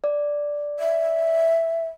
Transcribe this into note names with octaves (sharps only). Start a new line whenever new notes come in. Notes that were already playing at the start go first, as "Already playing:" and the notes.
D5
E5